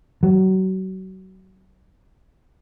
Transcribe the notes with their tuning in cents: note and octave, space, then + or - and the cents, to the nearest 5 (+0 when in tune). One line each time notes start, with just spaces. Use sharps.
F#3 +30